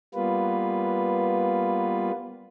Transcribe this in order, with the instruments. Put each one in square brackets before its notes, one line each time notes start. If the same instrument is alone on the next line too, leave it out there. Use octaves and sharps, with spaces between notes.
[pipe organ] G3 A#3 B3 F4 B4